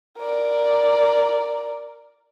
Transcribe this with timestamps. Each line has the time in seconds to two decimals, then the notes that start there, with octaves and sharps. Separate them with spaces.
0.19 A#4 D5